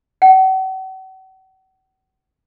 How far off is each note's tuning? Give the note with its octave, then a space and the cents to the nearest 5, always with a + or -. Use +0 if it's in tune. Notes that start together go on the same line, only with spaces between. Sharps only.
F#5 +45